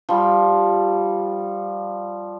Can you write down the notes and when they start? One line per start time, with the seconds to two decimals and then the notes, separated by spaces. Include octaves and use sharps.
0.09 F3 G3